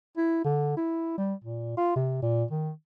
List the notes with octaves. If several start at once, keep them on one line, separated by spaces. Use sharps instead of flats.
E4
D3
E4
G3
A#2
F4
C3
A#2
D#3